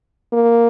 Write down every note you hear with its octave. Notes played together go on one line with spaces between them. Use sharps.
A#3